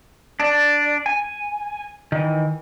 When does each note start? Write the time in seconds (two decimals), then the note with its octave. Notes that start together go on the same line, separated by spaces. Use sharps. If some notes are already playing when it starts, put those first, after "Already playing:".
0.40 D4 D5
1.06 G#5
2.12 D#3 E3